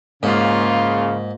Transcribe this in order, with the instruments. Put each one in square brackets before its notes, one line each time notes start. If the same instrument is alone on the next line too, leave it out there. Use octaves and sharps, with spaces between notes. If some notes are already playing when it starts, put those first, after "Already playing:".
[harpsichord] G#2 [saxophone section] C#3 [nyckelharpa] A#3 F4